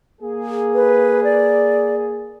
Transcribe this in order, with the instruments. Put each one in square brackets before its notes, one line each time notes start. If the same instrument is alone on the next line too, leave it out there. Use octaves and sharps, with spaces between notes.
[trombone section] A#3 G#4
[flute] B4
D5